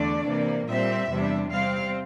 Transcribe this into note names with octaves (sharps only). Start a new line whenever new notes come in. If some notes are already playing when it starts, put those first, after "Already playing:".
Already playing: E2 D3 A3 D4 D5
C3 E3 A#3
A#2 G3 C4 E5
E2 C3 G3 D4
C3 G3 C4 F5